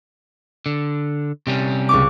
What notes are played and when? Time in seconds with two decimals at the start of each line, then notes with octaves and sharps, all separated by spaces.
0.66 D3
1.47 C3 G3 C#4
1.89 C#2 C#6 D6